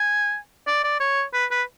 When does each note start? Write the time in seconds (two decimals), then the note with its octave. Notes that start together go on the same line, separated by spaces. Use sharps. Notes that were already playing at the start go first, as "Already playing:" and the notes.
Already playing: G#5
0.67 D5
0.84 D5
1.00 C#5
1.33 B4
1.51 B4